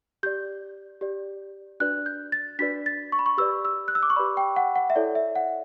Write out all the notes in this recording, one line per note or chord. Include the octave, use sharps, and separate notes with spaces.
G4 D5 G6
G4 D5
D4 F#4 B4 D5 F#6
G6
A6
D4 F#4 B4 D5 B6
A6
C#6
B5
C#6
G4 B4 D5 E6
E6
F#6
E6
D6
C#6
G4 B4 D5 B5
G5
F#5
F#5
E5
E4 A4 C#5 D5
E5
F#5